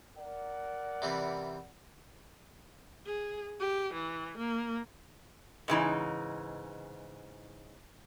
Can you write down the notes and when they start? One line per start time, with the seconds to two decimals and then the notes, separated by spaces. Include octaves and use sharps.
0.17 A#4 D5 F#5
1.02 C3 E3 G3
3.06 G#4
3.60 G4
3.93 E3
4.38 A#3
5.68 G#2 C#3 E3 D#4